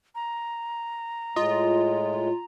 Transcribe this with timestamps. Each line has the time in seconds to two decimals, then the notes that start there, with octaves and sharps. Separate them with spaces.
0.15 A#5
1.36 A2 G#3 F4 D#5